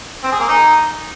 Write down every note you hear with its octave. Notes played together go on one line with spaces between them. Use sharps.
C4
G#4
A#3
D#4